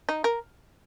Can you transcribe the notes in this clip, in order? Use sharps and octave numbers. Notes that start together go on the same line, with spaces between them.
D#4
A#4